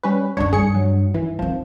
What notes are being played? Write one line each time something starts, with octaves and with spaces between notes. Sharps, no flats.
G3 C#4 B4
C#2 F#2 D3 D4 C#5
G2 G#4 C#7
F#3
E3 E4
D#3 F3 C4